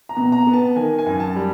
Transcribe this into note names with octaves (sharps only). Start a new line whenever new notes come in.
A#5
B2
A#5
B3
A5
D#3 G#5
G#5
F#2
A5
G3